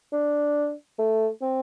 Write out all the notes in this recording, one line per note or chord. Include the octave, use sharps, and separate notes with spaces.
D4
A3
C4